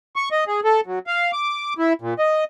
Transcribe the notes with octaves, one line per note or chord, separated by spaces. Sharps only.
C#6
D#5
G#4
A4
F#3
F5
D6
E4
A#2
D#5